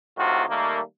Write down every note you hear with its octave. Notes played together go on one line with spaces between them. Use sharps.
A2 C3 D#3 F4 F#4
D#3 G3 A3 A#3